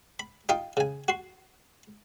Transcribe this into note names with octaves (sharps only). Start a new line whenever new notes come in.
B5
D#4 F4 G5 D#6
C#3 G#5
F#4 C6